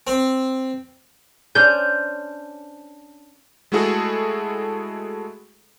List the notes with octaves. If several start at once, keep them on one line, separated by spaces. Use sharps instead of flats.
C4
C#4 D4 C5 G6
G#3 A3 E4 F#4 G#4 A4